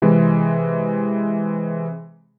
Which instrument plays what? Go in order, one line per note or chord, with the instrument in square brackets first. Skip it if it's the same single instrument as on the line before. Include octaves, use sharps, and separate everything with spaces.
[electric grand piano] C3 E3 G#3